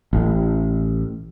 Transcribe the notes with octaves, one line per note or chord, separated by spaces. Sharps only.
A1